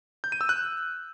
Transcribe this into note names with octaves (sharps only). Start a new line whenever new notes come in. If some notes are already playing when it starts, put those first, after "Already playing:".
G6
D#7
E6
F#6